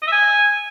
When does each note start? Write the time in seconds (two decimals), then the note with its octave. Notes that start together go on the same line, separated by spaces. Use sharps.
0.02 D#5
0.07 E5
0.12 G#5